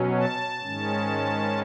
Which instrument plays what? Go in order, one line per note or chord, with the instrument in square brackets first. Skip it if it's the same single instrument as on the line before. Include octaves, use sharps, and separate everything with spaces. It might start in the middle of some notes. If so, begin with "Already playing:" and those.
Already playing: [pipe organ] B2 F#3 C#4
A5
G#2 D#3 G#3 C#4